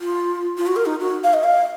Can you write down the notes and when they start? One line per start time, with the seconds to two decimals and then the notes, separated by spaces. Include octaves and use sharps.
0.01 F4
0.57 F4
0.67 F#4
0.76 A#4
0.86 D#4
1.00 F#4
1.24 F5
1.34 D#5
1.44 F5